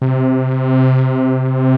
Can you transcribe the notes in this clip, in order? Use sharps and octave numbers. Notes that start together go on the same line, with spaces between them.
C3